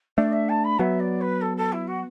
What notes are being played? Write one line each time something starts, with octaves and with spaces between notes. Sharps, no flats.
A3 D4 D5
E5
A5
B5
F#3 B3 E5
D5
B4
A4
A4
E4
F#4